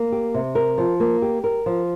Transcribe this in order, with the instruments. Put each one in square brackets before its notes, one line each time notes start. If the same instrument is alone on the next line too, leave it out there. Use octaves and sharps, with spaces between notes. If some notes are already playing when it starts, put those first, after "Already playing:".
Already playing: [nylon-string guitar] A#3
G4
C3
A#4
F3
A#3
G4
A#4
F3